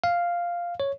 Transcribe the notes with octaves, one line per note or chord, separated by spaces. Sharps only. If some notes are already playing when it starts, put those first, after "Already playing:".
F5
C#5